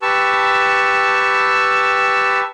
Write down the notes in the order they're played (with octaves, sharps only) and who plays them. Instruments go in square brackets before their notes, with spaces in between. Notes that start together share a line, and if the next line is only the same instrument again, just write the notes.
[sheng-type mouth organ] G4 B4 A5 C#6 E6